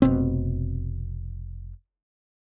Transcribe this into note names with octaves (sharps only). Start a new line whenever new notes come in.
F1 B2 C4